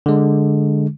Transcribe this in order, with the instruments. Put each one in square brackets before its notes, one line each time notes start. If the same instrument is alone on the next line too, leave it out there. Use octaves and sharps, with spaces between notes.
[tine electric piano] D3 G#3